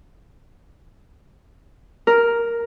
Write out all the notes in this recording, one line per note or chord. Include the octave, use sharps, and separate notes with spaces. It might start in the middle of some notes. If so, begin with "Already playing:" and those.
A#4